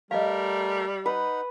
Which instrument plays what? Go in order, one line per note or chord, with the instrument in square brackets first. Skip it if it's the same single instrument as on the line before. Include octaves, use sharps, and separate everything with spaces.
[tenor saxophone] G3 [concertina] A3 A#4 A#5 [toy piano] D#5 F5
[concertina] D#4 F#5 [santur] B4